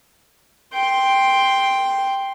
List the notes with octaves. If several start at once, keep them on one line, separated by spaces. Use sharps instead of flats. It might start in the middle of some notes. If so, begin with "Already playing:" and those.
G5 C6